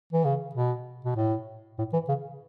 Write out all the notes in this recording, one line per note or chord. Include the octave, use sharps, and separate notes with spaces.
E3
C#3
B2
B2
A2
A2
E3
C#3